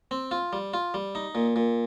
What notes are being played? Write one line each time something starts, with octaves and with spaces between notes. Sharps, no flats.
C4
F4
G3
F4
G3
D#4
A#2
A#2